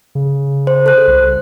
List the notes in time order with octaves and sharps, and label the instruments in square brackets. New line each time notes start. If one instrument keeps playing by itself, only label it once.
[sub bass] C#3
[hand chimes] C5
A4 C5 F#6
[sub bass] C2